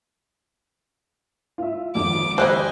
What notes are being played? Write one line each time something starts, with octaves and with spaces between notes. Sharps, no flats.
F4 E5
G#1 F2 D6
E3 G3 D#4 C5 D#5 G#5 F#6